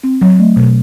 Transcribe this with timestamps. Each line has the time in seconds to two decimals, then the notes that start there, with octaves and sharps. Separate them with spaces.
0.04 C4
0.21 F#3
0.39 A3
0.56 B2